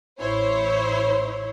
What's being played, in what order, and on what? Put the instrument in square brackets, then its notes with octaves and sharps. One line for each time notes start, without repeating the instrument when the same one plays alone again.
[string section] A1 E4 C5 C#5